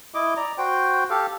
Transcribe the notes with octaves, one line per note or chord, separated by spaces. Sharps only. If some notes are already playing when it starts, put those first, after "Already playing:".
E4 D#5 D6
D5 A#5
F#4 C5 G5
G4 A4 F5